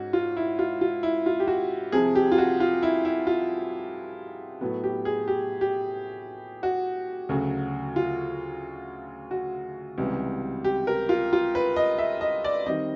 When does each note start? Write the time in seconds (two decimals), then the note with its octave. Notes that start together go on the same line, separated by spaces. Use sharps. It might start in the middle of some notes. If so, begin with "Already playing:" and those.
Already playing: G#2 C#4 F#4
0.13 F4
0.37 E4
0.59 F4
0.81 F4
1.03 E4
1.26 F4
1.40 G4
1.48 F#4
1.92 C2 C3 F3 G#4
2.15 G4
2.32 F4
2.38 F#4
2.60 F4
2.83 E4
3.05 E4
3.27 F4
4.61 A2 F#3 B3
4.84 G4
5.05 G#4
5.28 G4
5.61 G4
6.63 F#4
7.29 D2 C#3 F#3
7.96 F4
9.31 F#4
9.98 C#2 C3 E3 G3
10.64 G4
10.87 A#4
11.09 F4
11.33 F4
11.55 B4
11.76 D#5
11.99 E5
12.21 D#5
12.44 D5
12.66 D#3 G3 C4 D#5